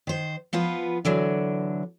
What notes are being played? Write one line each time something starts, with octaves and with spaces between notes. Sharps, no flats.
D#3 C5
F3 B3 F4 B4
D3 E3 F#3 D4